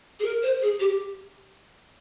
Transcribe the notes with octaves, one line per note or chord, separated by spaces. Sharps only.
G#4
A#4
C5
G#4
G4